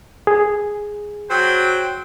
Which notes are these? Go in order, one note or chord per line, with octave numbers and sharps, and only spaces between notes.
G#4
F#3 C5 G5